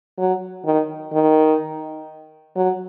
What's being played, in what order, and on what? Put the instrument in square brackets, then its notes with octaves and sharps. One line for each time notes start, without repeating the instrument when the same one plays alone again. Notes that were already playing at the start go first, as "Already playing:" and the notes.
[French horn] F#3
D#3
D#3
F#3